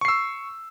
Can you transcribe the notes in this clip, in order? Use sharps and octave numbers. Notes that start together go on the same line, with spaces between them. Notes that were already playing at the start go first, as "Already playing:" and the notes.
C#6 E6 C7